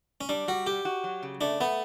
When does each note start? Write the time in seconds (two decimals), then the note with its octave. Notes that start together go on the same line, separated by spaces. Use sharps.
0.21 C#4
0.29 G3 D4
0.48 G3 F#4
0.66 F#4 G4
0.85 F#4
1.04 F#3
1.23 C#3
1.41 A3 D4
1.60 A3 B3